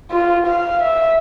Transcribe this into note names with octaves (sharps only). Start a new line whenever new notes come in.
F4
F5
E5